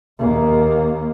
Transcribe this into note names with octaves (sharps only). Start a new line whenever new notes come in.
D#2 A#3